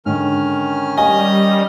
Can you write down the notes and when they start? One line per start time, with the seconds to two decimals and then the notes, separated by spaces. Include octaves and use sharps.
0.06 G#2 D3 D#3 C#4 F6
0.98 G3 D#5 G#5